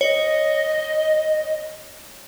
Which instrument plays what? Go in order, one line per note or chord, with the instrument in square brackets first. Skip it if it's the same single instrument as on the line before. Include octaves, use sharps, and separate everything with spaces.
[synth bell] C#5 [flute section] D#5